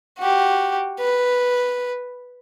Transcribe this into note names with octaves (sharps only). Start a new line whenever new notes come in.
F#4 G4
B4